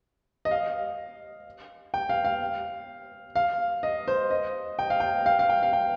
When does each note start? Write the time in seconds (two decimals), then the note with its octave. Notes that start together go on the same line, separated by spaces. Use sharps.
0.45 D#5
0.51 F5
1.94 G5
2.09 F5
2.25 F5
3.35 F5
3.83 D#5
4.08 C5
4.31 D#5
4.79 G5
4.90 F5
5.00 G5
5.26 F5
5.39 F5
5.49 G5
5.63 F5
5.73 G5